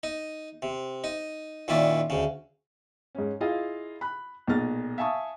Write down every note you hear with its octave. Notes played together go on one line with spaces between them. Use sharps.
D#4
C3
D#4
A#2 D#3 C#4 E4 D5
D2 C#3
G#2 C#4
E4 F4 G#4 D#5 F5
B5 F#6
B1 A#2 G#4 D#5 F6 A6
E5 F5 G#5 A5 C#6 D#6